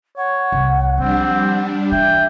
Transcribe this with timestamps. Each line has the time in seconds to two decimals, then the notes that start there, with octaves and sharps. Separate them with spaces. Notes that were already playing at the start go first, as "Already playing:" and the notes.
0.18 C#5 F#5
0.52 C2
0.98 F3 G3 C4 D4
1.92 E3 E5 G5